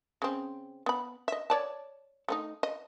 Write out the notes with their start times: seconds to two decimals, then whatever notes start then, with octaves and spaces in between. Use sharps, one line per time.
0.22 C#3 C4
0.86 B3 B5
1.28 D#5 E5
1.50 C#5 D5 A5
2.28 A3 C#4 D#4
2.63 D#5